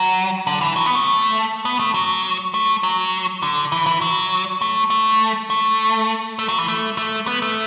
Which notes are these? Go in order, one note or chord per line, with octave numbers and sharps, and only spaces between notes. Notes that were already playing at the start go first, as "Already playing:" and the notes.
Already playing: F#3
D3
E3
F#3
B3
A3
B3
A3
F#3
A3
F#3
D3
E3
E3
F#3
A3
A3
A3
A3
F#3
E3
A3
A3
B3
A3